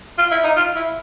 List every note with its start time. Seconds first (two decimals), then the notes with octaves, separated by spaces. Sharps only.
0.18 F4
0.31 E4
0.44 D#4
0.57 F4
0.76 E4